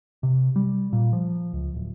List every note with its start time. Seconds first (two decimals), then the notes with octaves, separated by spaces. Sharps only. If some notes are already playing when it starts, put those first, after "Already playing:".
0.23 C3
0.56 G3
0.93 A#2
1.13 F3
1.53 C#2
1.75 D1